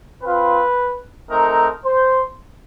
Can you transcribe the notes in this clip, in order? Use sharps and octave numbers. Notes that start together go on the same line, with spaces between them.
C4 F4 B4
A3 C4 D#4 A#4
C5